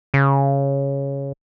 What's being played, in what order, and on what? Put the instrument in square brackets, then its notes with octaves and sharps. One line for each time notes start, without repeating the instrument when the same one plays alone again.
[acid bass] C#3